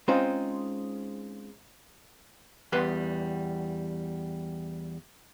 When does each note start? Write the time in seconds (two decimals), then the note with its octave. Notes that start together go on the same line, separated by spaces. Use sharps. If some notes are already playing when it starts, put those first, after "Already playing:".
0.08 G#3 C4 C#4 D#4 F4 C5
2.72 E2 G3 B4 C6